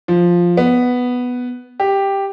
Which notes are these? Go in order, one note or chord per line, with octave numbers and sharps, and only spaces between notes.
F3
B3
G4